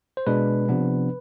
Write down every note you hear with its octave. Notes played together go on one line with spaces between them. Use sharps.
C5
B2 G#3 D4 B4
C3 F3 B3 D4